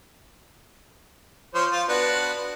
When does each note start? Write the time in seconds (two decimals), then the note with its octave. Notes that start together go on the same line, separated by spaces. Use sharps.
1.54 F3 C5 C#5
1.72 F4
1.89 B3 D4 F#4